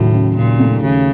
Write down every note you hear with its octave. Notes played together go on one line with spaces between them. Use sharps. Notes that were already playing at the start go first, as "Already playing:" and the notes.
Already playing: D#2 A2 C#3 F#3
C#3
A#2 C#3
A3
D#2 C#3